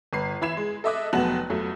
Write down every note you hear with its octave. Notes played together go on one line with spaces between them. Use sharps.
G1 B4 C7
E3 E5 B5 G#6 C7 E7
G#3
A4 D#5 E5 D6 D#6 F#6
F1 F#3 B3 A5 F#6 F#7
F2 F#3 A3